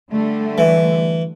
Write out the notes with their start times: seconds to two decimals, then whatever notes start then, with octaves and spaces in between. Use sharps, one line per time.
0.12 D3 G3 A3
0.58 E3